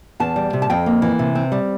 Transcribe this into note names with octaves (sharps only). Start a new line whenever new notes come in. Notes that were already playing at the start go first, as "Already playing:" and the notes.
E2 A5
G3
C3
A5
F2 G5
A#3
E3
C3
C4
G3